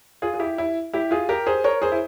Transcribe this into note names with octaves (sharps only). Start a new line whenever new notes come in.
F4 G#4
G#4
E4 G4
E4
E4 G4
F4 G#4
G4 A#4
G#4 C5
A#4 C#5
G#4 C5
E4